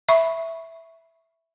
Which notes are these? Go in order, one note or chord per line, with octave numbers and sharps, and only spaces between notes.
E5 B5 C#6